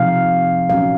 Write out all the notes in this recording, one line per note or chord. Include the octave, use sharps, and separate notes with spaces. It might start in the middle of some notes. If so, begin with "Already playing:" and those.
Already playing: C3 F3 C4 D#4 F5
A#2 F#3 C#4 F5